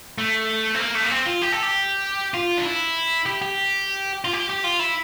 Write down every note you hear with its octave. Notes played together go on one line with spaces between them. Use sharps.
A3
C4
A#3
A3
A#3
C4
F4
G4
A4
G4
F4
D4
E4
G4
G4
F4
G4
G4
F4
E4